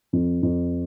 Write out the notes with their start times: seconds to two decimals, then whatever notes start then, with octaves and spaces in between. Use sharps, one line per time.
0.13 F2
0.43 F2